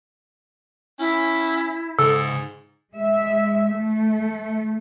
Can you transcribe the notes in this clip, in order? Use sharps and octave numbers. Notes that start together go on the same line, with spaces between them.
C#4 E4
G#2 C#3 A4
G#3 E5
A3